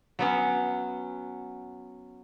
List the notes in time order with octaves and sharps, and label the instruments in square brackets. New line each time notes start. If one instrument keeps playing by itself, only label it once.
[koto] F#3 B3 C#4